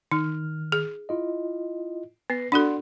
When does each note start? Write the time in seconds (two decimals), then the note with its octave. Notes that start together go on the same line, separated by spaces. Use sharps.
0.12 D#3 D#4 F6
0.72 G#4
1.09 E4 F4 D#5
2.30 B3 B4 A#6 C7
2.52 D4 F#4 A4 D5 F#5 C6